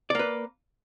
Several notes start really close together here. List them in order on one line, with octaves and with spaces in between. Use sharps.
D5 A#3 B4